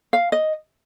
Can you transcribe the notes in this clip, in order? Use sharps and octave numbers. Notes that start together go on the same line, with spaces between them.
F5
D#5